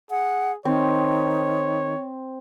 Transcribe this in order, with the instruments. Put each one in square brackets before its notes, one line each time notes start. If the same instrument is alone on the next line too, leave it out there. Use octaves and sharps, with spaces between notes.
[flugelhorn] G#4 [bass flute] F#5
[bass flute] D#3 [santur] C4 [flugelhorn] C#5